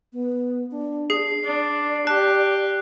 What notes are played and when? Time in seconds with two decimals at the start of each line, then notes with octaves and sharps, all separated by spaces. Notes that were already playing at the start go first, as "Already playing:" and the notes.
0.13 B3
0.71 D4
1.10 D4 G#4 C7
1.44 D4 D5
2.07 G4 A5 F#6